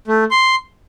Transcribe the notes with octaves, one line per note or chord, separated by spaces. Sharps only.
A3
C6